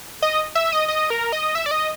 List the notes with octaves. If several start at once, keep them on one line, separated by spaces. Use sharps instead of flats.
D#5
E5
D#5
D#5
A#4
D#5
E5
D5
D#5